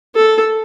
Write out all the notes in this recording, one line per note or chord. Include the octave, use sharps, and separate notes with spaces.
A4